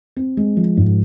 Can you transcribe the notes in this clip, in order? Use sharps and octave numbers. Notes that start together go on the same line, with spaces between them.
C4
G#3
F3
G#2